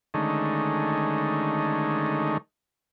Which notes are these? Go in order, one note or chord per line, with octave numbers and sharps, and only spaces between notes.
D3 D#3 G#3 A3 C#4 D#4